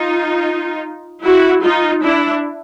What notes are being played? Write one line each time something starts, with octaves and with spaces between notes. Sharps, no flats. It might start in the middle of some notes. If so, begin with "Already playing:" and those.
Already playing: D#4 F4
E4 F#4
D#4 F4
D4 E4